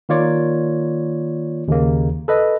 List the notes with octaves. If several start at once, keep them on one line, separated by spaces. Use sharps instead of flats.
D#3 A#3 F4 C#5 D5
D#2 C#3 A#3
A4 B4 D#5